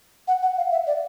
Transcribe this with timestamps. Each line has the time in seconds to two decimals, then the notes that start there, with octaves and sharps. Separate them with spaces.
0.28 F#5
0.43 F#5
0.57 F5
0.71 E5
0.87 D5